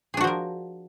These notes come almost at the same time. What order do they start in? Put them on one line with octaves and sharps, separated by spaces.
G#4 D4 F#4 F3 A#4